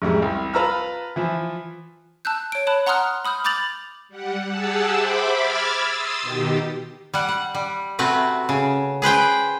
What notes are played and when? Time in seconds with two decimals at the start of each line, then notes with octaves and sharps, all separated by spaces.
0.02 A1 F2 G3 G#3
0.22 C2
0.54 F4 B4 A5 A#5 E6 F6
1.16 E3 F3
2.25 A5 E6 F#6 G6
2.52 C#5 D7
2.67 C#5 A5 B5 F#6
2.86 F#5 A#5 C6 D#6 F6 F#6
3.25 B5 D#6 F6 G6
3.44 B5 D6 G6 A6 F7 F#7
4.09 G3 F#5
4.48 G4 G#4 F#5 A5 E6
4.91 C5 E5 B5 D6
5.34 B5 D6 E6 F6 G#6 A6
5.86 C6 D#6 E6 A6
6.22 B2 D#3 G4
7.14 G3 F#5
7.29 F#5
7.55 G3
7.99 C3 A3 C4 F#4 B4
8.49 C#3
9.02 G#4 B4 C5 G5